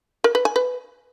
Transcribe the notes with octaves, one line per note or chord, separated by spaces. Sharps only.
A#4
B4
G#5
B4